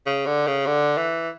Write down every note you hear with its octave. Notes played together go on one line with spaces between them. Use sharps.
C#3
D3
C#3
D3
E3